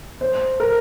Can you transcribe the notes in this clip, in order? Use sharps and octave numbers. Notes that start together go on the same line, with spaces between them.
C5
A#4